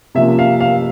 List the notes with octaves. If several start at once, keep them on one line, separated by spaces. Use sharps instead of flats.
C3 F3 A#3 C#4 E5
F5
F5